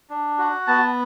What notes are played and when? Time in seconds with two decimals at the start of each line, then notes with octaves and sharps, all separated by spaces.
0.10 D4
0.39 F#4
0.67 B3 A5